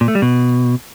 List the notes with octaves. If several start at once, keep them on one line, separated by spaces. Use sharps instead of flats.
A#2
A3
G3
B2